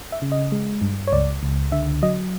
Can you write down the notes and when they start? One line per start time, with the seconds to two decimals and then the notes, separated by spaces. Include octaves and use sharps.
0.12 E5
0.22 C#3
0.32 D#5
0.52 G#3
0.82 G2
1.07 C#5
1.13 C#2 D5
1.43 C#2
1.72 D3 E5
2.02 F#3 D#5